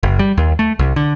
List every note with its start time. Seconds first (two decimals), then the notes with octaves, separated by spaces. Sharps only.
0.03 F#1
0.19 G3
0.38 D#2
0.59 A3
0.79 C2
0.96 D3